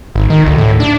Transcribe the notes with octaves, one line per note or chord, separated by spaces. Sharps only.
G#1
D#3
D2
A2
D4